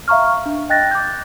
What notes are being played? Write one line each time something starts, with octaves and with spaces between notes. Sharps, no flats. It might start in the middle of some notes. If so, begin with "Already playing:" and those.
E5 F5 A#5 C#6 F6
D4
D#5 G5 F#6 A6 A#6
D6 G6